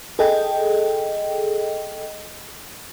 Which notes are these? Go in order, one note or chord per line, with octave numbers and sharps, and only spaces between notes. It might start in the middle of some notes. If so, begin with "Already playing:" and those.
G#4 A4 D#5 G5